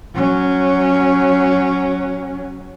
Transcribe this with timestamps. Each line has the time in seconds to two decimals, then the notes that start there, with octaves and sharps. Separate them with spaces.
0.14 F#3 C#4